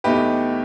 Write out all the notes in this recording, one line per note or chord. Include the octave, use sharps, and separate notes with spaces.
E2 B2 A3 D#4 G4 B4